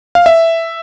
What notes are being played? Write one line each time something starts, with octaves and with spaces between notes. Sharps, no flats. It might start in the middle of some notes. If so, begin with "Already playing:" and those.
F5
E5